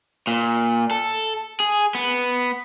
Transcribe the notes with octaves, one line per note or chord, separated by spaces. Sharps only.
A#2
A4
G#4
B3